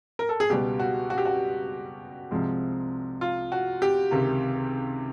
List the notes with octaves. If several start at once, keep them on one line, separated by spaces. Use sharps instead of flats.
A#4
A4
G#4
C#2 B2 G3 B3 G4
F#4
F#4
G4
F#4
C2 C3 F3 G#3 C4
F4
F#4
G4
C#2 C3 D#3